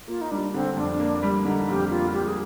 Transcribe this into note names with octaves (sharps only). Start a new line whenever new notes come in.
A#3 F4
D#4
G3 D4
D3 C4
F2 D4
A#3
G3
D3 D#4
F2 G4
A#3 F4
G3 G4
G#4